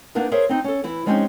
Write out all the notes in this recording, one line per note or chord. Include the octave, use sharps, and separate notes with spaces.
A#3 B3 D4 D#4 A#4
G#4 A#4 C5 C#5 E5
C4 D#4
C#4 A4
E3 E4
F3 G#3 C4 C#4 D#4 G4